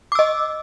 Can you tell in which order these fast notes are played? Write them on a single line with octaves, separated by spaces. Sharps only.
D6 E6 D#5